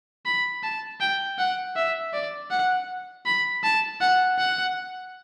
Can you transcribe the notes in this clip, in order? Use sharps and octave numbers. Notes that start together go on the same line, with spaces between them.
B5
A5
G5
F#5
E5
D5
F#5
B5
A5
F#5
F#5